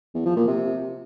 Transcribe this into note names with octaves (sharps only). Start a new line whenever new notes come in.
E2
F3
A#2
C3